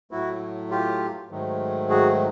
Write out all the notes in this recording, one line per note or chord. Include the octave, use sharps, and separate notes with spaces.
A2 F#3 A3 E4 F#4
F4 G4
G#2 D#3 F#3 A3
F#4 G#4